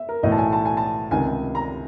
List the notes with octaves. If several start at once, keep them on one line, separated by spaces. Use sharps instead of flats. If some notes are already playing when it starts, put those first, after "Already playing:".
Already playing: E5
A#4
B1 A2 E3 D#5
A5
G#5
A5
G#5
A5
C#2 C3 D#3 G#5
A#5